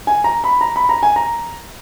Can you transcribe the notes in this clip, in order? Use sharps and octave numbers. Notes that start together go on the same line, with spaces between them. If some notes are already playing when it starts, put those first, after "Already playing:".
G#5
A#5
B5
A#5
B5
A#5
G#5
A#5